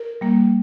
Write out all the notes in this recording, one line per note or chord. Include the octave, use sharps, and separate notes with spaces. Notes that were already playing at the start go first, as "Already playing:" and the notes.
Already playing: A#4
G3 A#3